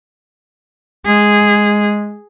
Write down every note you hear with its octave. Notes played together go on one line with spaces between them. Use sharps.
G#3 G#4